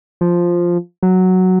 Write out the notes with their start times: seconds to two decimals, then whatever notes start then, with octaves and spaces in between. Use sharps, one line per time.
0.21 F3
1.03 F#3